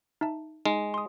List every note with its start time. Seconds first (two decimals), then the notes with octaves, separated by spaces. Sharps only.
0.21 D#4 E5 A5
0.65 G#3 D#4
0.94 C6 D#6